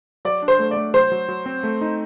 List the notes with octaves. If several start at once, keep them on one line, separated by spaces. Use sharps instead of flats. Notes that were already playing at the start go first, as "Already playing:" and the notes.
F#3 D5
D4
C5
A3
D5
A3
F#3 C5
F#3
F#3
C4
A3
D#4